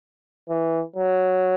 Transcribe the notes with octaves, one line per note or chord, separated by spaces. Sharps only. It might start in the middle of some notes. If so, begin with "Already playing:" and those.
E3
F#3